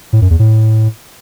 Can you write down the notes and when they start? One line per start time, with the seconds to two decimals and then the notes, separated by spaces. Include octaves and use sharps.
0.13 A2
0.22 F#2
0.30 E2
0.39 A2